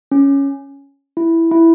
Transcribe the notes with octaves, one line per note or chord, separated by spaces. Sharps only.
C#4
E4
E4